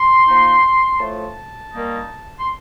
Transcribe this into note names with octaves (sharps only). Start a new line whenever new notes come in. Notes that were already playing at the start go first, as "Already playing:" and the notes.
Already playing: C6
F3 A#3 D#4
A2 F3 A3 A5
D#3 G3 A#3 D#4
C6